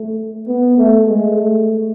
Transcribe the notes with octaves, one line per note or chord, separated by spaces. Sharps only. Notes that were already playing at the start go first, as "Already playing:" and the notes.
Already playing: A3
B3
A3
G#3
A3